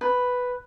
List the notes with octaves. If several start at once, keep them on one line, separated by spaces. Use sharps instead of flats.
B4